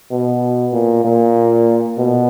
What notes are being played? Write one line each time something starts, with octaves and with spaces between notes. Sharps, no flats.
B2
A#2
A#2
B2